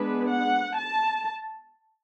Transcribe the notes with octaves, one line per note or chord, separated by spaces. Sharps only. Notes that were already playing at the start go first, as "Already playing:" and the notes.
Already playing: G#3 B3 D4 B4
F#5
A5